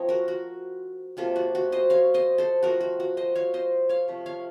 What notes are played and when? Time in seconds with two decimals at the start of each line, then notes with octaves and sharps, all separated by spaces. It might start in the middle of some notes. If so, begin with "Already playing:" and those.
Already playing: F3 A3 C4 C#5 D#5
0.09 F#4 A#4
0.28 F#4
1.17 C3 F#3 A#3 F4 A4
1.36 F#4
1.55 F#4
1.72 C5 D#5
1.90 C#5 F5
2.14 C5 D#5
2.38 A4 C5
2.63 F3 A3 C4 D#4 F#4 A#4
2.81 F#4
3.00 F#4
3.17 C5 D#5
3.35 C#5 F5
3.54 C5 D#5
3.89 C#5 F5
4.08 C3 F3 A3
4.26 C#5 F5